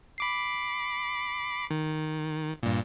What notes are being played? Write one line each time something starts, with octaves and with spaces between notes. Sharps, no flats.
B5 D6 C7
D#3
G2 A#2